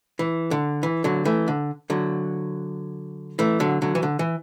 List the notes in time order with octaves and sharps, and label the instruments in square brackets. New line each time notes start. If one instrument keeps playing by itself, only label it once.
[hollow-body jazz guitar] E3
D3
E3
D3 F#3
E3 A3
D3
D3 F#3
E3 A3
D3 F#3
D3 F#3
E3
D3
E3